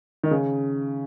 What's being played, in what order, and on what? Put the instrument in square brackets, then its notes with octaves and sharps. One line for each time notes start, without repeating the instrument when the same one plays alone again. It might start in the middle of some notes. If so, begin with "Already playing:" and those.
[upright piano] D#3
C#3